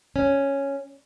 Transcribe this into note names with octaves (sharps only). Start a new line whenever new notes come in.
C#4